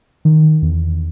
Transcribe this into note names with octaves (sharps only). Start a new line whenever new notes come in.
D#3
E2